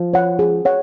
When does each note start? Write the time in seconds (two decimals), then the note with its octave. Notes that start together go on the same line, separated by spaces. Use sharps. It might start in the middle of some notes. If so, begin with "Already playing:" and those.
Already playing: F3
0.13 C#5 F#5
0.39 G#4
0.65 C#5 F#5